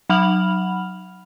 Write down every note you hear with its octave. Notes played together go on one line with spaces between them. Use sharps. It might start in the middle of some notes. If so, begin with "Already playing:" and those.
F#3 F#5 B5 F6 F7 F#7